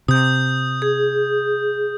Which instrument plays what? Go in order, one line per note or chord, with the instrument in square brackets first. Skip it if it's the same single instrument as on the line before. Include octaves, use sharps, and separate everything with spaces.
[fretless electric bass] C3 [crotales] D#6 G6
[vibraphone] G#4